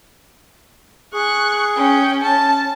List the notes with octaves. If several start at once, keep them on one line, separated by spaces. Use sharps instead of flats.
G#4 C#6 F#6
C#4 G5
C#4 A5